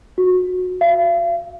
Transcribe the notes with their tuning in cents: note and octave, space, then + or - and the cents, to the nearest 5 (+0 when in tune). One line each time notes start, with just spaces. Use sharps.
F#4 -20
F5 -40